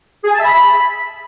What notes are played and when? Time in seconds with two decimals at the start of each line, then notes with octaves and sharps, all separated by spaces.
0.24 G#4
0.29 G#5
0.35 A5
0.40 E5
0.45 B5